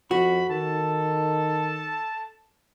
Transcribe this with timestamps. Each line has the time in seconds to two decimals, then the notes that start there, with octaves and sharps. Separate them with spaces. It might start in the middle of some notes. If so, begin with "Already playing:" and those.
0.11 F2 F#4 B5
0.50 D#3 A4 A5